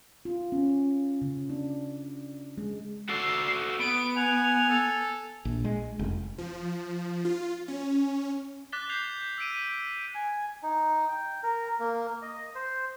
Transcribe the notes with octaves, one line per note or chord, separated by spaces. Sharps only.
F4
C#4
C#3
D4
G#3
F#4 A4 D5 C7
B3 D7
F#5 G#5 F7
A4
A#1
G#3
F1
F3
F4
C#4
D6 F#6 A6 B6 G7
D6 G6 C7 F7
E6 B6 D7 D#7
G#5
D#4
G5
A#4
A#3
D#5
C5